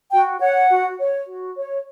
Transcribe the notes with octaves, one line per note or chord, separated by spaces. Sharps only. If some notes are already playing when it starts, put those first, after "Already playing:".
F#4 G5
C#5 F#5
F#4
C#5
F#4
C#5